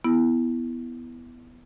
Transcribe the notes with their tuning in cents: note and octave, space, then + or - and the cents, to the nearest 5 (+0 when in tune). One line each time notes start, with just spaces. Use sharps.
B3 +0 E4 +0